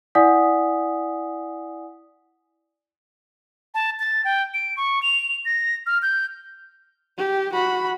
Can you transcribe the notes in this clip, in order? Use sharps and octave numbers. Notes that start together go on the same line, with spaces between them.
E4 D5 F#5 G#5 D#6 B6
A5
A6
G5
D7
C#6
F7
A#6
F6
G6
G4
F#4 B5